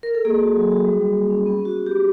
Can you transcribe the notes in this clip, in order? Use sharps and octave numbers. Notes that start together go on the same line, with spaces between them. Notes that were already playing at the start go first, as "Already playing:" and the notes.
A#4
A4
A#3 G#4
F#4
F#3
F#4
G3
G3
A#3
C#4
B3
B3 F#4
B3
B3 G4